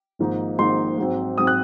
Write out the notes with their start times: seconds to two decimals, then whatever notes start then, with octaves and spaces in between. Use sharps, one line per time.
0.19 G#1 G#2 F3 A#3 D#4
0.58 G#1 G#2 F3 A#3 D#4 C6
0.98 G#2 F#3 C4
1.38 G#2 F#3 C4 D#6
1.47 F#6